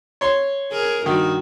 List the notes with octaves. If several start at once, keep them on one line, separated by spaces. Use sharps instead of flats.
C#5 C6
G#4 A#4
G2 D#3 F#4